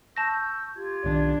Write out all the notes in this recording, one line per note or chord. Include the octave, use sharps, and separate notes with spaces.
A5 C#6 E6 G6 A#6
F4 G4 G#6
B1 D#3 D4